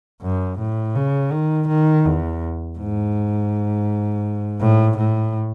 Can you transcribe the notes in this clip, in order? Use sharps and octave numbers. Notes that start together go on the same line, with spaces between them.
F#2
A2
C#3
D#3
D#3
E2
G#2
A2
A2